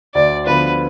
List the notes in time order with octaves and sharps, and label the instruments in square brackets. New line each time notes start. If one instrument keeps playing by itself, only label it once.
[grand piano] D2 [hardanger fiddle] D5
[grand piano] D3 F3 B3 F4 [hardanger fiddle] B4